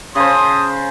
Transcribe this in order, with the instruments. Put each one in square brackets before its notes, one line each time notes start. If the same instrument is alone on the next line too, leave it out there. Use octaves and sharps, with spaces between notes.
[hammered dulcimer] C#3 C5 [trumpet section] A5 C6 D#6